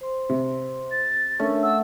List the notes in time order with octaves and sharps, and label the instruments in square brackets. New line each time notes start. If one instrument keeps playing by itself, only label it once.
[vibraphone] C5 C6
[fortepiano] C3
[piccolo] A6
[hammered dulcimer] A3 [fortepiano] C#4 [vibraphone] D4 A#4
[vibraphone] F#5 [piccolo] E6